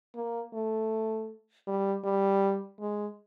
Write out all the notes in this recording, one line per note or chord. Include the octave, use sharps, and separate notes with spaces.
A#3
A3
G3
G3
G#3